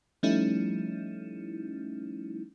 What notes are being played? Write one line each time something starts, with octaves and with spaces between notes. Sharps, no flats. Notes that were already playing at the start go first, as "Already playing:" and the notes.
F3 G3 A3 C#4 D#4 E4